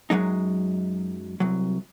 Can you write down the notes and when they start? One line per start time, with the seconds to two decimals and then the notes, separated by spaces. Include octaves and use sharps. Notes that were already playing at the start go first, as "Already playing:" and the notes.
0.10 F#2 F#3 G#3 D#4
1.40 C2 F#3